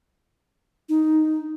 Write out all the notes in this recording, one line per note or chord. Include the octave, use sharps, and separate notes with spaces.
D#4